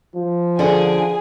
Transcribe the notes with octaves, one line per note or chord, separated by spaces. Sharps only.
F3
D3 G#4 D5 F#5 G#5